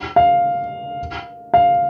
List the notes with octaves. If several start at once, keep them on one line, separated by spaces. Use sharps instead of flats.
F5
F5